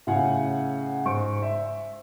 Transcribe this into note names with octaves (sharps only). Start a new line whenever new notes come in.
A2 C#3 F5 F#5 G#5
G#2 C5 C#6 D7
E5